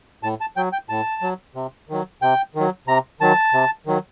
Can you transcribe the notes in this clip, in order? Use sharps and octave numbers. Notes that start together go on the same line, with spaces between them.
A2 A5
A5
F#3 G5
G5
A2 A5
F#3
C3
D#3 F#3
C3 G5
D#3 F#3
C3 A#5
D#3 F#3 A5
C3
D#3 F#3